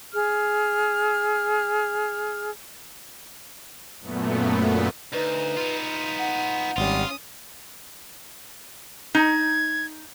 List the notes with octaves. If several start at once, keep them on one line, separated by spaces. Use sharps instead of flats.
G#4 F6
F#2 A#2 A3 B3
D2 D#4 B4
B3 F4
F#5
G#1 G3 C#4 F4 D#6
D#4 A#5 G#6